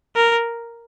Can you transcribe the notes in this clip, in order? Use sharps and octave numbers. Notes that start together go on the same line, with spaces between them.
A#4